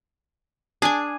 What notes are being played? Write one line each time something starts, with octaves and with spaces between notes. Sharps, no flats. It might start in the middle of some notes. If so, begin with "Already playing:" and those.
D4 G#4 G#5